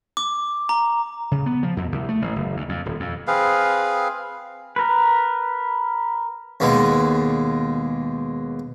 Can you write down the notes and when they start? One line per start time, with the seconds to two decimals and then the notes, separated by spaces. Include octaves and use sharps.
0.17 D6
0.69 A#5
1.31 C#3
1.46 B3
1.63 F3
1.77 F2
1.92 C2
2.09 A3
2.22 A1
2.36 F#1
2.57 D2
2.69 F2
2.86 D#1
3.00 F2
3.28 C4 G#4 B4 F5
4.76 A#4 B4
6.60 D#2 B2 G#3